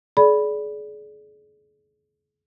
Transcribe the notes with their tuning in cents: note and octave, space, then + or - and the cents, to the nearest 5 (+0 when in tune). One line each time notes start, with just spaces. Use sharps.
G#4 +35 D5 -15 B5 +0